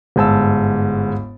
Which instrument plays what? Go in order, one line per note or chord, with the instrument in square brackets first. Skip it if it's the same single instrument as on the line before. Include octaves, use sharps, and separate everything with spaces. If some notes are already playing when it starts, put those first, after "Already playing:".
[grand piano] G1 G#2 A5 E6